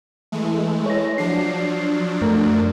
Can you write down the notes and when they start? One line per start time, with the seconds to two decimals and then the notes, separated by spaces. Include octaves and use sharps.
0.32 E3 G#3 A3
0.86 C#5 A#6
1.18 F3 F#3 D4 C7
2.21 F#2 A3 A#4